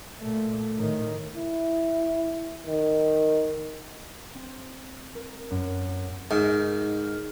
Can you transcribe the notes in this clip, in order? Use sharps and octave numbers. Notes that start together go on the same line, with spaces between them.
A#2 A3
A2 D#3
E4
D#3
C4
A#4
F#2
G#2 D#3